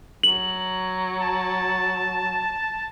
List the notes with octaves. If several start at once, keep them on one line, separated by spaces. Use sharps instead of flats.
F#3 F#7
A5